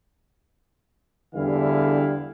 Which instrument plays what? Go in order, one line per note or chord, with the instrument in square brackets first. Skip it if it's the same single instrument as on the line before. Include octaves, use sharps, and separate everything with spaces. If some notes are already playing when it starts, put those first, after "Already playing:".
[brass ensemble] E2 D3 E3 G3 E4 F5